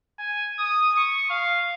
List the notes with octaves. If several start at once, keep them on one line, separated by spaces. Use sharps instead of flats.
G#5
D#6
C#6
F5